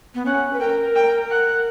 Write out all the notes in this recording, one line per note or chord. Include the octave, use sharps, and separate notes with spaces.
B3
C#4 F#5
B4
A#4 G5
G5
F#5